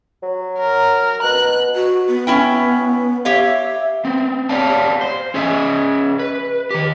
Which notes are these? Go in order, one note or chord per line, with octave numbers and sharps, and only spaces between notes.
F#3
A#4
B2 F#6
F#4
B3
C#4 E4 G5
G4 C#5 E5 F5
B3 C4
G4 C#5 D5 F5 F#5 A5
C5
C#4 G#4 D#5 E5
B4
D#3 G4